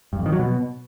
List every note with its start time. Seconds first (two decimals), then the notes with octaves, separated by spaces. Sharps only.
0.13 G2
0.19 F2
0.26 D#3
0.32 F#3
0.39 B2